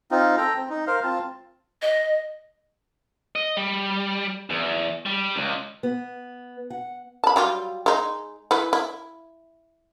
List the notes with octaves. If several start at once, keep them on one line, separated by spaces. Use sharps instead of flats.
C4 D#4 F4
A4 G5 A#5
C4
D#4
A#4 C5 F5
C4 F4 A5
D#5
D#5
G3
E2
G3
C#2
B3
F#5
A5 B5
F#3 G3 F4
G#3 D#4
E3 B4
E4